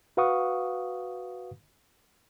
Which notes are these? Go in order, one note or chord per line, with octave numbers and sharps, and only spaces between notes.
F#4 B4 F5 F#5 C#6 D#6